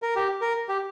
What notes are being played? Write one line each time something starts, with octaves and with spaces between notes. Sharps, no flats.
A#4
G4
A#4
G4